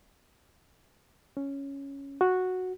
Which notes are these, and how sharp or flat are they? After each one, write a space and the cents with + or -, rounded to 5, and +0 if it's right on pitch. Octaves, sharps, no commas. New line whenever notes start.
C#4 +0
F#4 -5